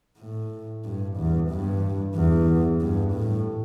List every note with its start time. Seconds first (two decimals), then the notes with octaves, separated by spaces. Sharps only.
0.19 A2
0.85 G2
1.17 E2
1.50 G2
2.15 E2
2.81 G2
3.13 A2